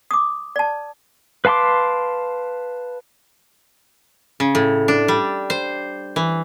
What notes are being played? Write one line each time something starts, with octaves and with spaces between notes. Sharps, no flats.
D6 D#6
D5 A5
B4 F5 A5 C6 D6
C#3
A2
D4
G3
C5
E3